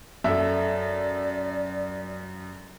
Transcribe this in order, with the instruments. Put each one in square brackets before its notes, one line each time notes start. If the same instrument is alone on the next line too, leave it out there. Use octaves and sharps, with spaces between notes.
[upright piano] F#2 [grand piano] A4 E5 [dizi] D5